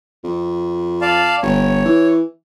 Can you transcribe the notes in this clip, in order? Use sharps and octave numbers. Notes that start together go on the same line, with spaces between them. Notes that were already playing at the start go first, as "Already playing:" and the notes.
F2
D5 F5 A5
G1 C#5
E3